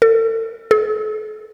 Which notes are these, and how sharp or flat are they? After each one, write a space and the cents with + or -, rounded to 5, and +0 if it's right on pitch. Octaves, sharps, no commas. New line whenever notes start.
A4 +40
A4 -45